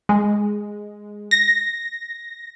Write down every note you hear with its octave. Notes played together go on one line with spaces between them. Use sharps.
G#3
A#6